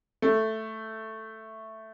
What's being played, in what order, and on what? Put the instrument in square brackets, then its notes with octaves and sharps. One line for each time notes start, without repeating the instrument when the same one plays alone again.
[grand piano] A3